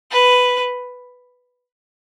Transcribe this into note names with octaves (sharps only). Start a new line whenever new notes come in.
B4